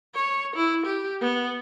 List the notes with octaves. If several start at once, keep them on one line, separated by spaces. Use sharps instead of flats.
C#5
E4
G4
B3